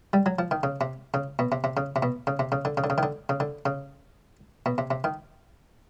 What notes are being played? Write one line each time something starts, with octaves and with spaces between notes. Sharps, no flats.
G3
F#3
F3
D#3
C#3
C3
C#3
B2
C3
C3
C#3
C3
B2
C#3
C3
C#3
D3
C#3
D3
C#3
D#3
D3
C#3
D3
C#3
B2
C3
C3
D#3